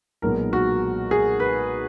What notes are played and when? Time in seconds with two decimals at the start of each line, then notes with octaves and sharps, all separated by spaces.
0.22 B1 A#2 G#3 B3 D#4 A#4
0.53 F#4
1.11 G#4
1.40 B4